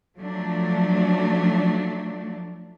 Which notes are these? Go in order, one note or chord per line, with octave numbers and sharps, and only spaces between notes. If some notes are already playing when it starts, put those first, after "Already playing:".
F3 F#3 A3 D4